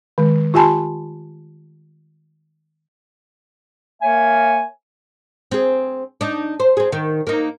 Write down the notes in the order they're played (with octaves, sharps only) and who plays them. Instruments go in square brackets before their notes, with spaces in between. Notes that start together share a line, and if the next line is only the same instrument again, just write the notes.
[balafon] D#3 G#3
F4 G4 G#5 A5 B5 C6
[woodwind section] A#3 A#4 C#5 E5 G#5
[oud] C4 G#4
D4 D#4
C5
C4 G#4
D#3
A#3 D#4